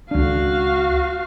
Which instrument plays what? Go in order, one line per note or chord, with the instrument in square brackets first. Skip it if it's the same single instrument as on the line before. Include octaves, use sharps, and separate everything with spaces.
[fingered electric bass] C#2 D4 [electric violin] F#4 F5